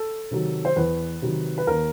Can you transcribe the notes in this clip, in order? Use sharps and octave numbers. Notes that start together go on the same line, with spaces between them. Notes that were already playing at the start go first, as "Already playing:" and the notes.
Already playing: A4
C3 D#3 F#3
C5
E2 B4
C3 D#3 F#3
B4
D#2 A#4